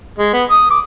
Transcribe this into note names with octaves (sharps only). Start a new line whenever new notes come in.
G#3
B3
D#6
D6